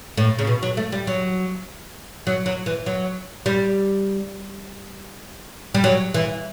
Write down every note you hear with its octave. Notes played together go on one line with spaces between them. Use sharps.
A2
C#3
B2
F#3
A3
G3
F#3
F#3
F#3
E3
F#3
G3
G3
F#3
E3